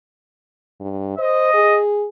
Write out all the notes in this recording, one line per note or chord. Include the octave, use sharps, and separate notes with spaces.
G2
C5 D#5
G#4